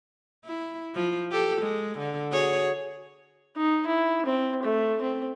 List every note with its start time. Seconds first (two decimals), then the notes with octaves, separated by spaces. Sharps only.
0.45 E4
0.95 F3
1.31 G4 A4
1.61 G#3
1.99 D3
2.32 F#4 G#4 C#5
3.56 D#4
3.86 E4
4.26 C4
4.63 A3
5.01 C4